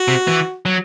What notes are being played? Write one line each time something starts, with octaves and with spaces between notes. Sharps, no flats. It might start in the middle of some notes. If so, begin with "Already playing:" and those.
Already playing: F#4
C3
E3
F#3